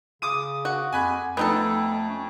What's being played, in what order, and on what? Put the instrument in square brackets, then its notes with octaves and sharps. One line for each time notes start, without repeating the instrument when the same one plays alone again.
[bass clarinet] C#3 [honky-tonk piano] D6 D#6 D#7
[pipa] F#4
[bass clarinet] F2 [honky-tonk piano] G#5 B5 F#6
[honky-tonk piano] F2 [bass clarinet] A3 [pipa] B3 D#4 A4
[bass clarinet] C#4